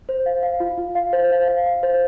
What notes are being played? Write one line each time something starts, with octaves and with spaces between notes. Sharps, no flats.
C5
F5
F5
F4
F4
F5
C5
F5
F5
F5
C5